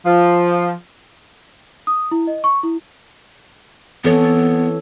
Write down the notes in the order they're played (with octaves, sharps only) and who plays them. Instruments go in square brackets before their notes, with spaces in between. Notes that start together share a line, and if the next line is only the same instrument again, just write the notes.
[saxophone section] F3
[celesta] D#6
E4
D#5
C#6
E4
[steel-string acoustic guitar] E3 [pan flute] B3 [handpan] C4 A4 C#5